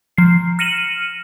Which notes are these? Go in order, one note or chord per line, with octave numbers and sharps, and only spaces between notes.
F3 C7
F6 A#6 C#7 D#7 E7 F#7